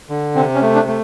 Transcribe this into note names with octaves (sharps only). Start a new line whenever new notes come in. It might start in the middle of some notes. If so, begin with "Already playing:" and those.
D3
C3 C4
C#4
A3
D4
A3